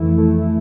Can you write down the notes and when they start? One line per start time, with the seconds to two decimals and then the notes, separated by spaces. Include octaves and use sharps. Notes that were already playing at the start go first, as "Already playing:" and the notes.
Already playing: F2 E3 A3 E4
0.18 A3